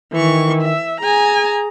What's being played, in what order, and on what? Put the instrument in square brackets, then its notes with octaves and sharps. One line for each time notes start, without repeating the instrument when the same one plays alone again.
[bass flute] D#3 [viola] E3 C#6
[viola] E5
[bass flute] G#4 [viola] G#5 A#5